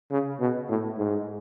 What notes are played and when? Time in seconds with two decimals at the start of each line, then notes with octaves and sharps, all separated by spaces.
0.11 C#3
0.40 B2
0.69 A2
0.98 G#2